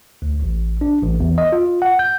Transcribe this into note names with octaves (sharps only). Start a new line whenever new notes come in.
D2
A1
D4
A1
E2
D#5
F4
F#5
G6